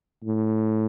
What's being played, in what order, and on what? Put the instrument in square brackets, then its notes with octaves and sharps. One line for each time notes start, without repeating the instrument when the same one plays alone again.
[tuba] A2